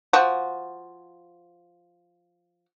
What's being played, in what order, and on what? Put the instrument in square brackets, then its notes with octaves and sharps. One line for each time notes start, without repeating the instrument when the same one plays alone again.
[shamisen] F3 F#4